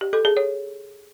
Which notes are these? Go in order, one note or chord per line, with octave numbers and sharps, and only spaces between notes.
G4
A4
G#4
C#5